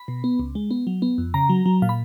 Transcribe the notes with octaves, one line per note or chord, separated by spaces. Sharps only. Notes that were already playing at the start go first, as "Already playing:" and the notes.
Already playing: B5
B2
B3
C#2
G#3
B3
F#3
B3
F2
C#3 A#5
F#3
F#3
A#2 F5
B5